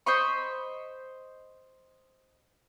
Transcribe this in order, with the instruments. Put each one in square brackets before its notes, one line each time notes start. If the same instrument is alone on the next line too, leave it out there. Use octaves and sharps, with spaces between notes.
[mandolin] C5 D#5 B5 C#6